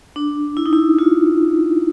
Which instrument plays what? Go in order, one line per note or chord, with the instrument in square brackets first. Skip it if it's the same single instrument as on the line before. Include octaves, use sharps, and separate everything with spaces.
[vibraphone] D4
E4
D#4
E4
F4